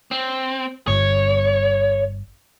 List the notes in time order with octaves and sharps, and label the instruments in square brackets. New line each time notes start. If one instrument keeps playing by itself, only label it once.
[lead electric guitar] C4
[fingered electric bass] G1 G2 [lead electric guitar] C#5